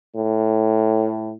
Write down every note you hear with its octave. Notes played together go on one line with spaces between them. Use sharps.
A2